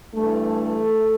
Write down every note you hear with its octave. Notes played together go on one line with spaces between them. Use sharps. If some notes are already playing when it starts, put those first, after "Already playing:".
G2 E3 A3